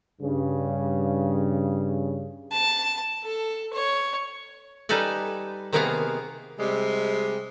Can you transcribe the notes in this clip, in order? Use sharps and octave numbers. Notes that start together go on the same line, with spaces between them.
G2 C#3
A5
A4
C#5
G3 D#4 A4 B4 G#5
C3 D#3 A#3 B3 G#4 F5
C3 G3 G#3